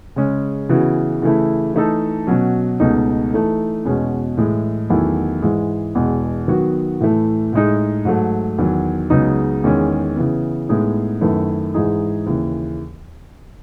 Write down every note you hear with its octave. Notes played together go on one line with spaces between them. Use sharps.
C#3 G#3 C#4
C#3 E3 B3 F#4
C#3 E3 A3 E4
E3 A3 D#4 A4
B2 F#3 C#4
C#2 B2 A3 D#4
E3 A3 D#4 A4
E2 B2 G#3 C#4 F#4
A2 E3 G#3
E2 D#3 F#3 A3 E4
G#2 E3 G#3
E2 B2 G#3
D#3 F#3 B3 F#4
A2 E3 A3
A2 G#3 D#4
G#2 F#3 A3
E2 D#3 F#3
C#2 C#3 F#3 B3 D#4
E2 D#3 G#3 C#4
C#3 E3 B3
A2 G#3 B3 D#4 G#4
F#2 D#3 A3 E4 B4
G#2 E3 G#3 D#4 G#4
D#2 C#3 E3